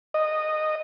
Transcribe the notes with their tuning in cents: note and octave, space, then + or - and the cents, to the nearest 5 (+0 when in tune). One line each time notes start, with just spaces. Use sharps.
D#5 -10